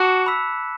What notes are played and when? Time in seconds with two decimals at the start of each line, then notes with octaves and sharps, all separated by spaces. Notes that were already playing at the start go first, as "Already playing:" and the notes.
Already playing: F#4 A5 D6 F#6 C#7 E7
0.26 B5 E6 B6